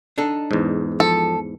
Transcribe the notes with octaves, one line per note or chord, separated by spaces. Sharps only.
D4 D#4 A4
E2 G#2
F3 A4